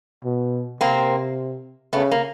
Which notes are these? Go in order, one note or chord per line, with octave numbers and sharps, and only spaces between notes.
B2
C3 A#3 C4
C#3 A3 B3
A#3